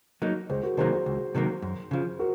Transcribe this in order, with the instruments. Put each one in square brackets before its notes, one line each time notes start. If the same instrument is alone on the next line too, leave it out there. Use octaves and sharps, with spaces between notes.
[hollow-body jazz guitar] F#3 A#3 D#4
[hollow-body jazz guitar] C#2 [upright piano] G#4 C5
[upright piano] F#4 A#4
[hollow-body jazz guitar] C3 D#3 F#3 A#3 [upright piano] G#4 C5
[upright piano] G#4 C5
[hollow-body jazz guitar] C#2
C3 D#3 F#3 A#3
F#2
C#3 F3
[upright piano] F#4 A#4